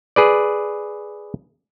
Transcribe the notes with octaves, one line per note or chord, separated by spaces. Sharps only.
G#4 B4 D5